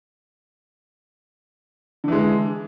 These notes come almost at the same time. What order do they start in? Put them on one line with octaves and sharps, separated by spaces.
D3 E3 G#3